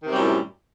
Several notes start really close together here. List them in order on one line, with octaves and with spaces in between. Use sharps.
D#3 C3 G3 F#2 A2